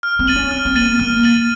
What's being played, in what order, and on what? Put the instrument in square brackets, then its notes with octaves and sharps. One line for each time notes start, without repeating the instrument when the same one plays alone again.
[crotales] F6
[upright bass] C4
[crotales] A6 D#7 F#7
[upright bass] C#4
[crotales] F6
[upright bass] C4
[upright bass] A#3 [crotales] A6 D#7 F#7
[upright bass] A#3 [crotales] F6
[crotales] A6 D#7 F#7